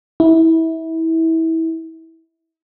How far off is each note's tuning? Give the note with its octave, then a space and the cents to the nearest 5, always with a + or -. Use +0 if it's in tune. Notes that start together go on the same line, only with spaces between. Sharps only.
E4 -25